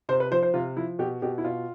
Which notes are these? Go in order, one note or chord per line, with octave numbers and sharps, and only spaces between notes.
C3 C5
B4
F3 C5
C5
C3 F4
F3 E4
B2 G4
B2 G4
E4
B2 F4